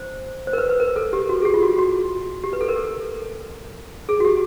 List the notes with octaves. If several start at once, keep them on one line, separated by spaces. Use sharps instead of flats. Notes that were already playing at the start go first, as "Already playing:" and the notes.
Already playing: C5
C5
A#4
B4
B4
A#4
A4
G4
F#4
G#4
G4
F4
F#4
F#4
G4
B4
A4
A#4
A4
G#4
F#4
G4